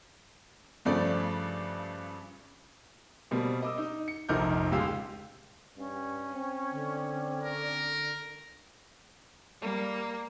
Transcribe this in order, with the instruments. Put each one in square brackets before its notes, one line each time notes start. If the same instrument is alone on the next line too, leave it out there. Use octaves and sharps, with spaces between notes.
[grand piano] G2 C#3 F3 A3 D5
B2 G3 A#3 C4
D#5 D6 E6
D#4
C#7
F1 A#1 D#4 A#4 D6 G6
C#2 A#2 G#3 G4 F5 E6
[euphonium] G2 [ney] C#4
[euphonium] C4
[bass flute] D3
[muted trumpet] A#4
[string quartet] G3 A#3